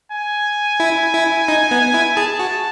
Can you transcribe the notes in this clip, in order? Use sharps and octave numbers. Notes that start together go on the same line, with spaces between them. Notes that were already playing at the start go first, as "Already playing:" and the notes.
G#5
E4
E4
D#4
B3
E4
G#4 A5
F#4